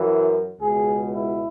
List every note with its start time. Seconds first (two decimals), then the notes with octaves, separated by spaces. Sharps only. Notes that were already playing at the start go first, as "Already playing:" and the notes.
Already playing: F#2 E3
0.60 C#2 B2 G#4
1.12 E4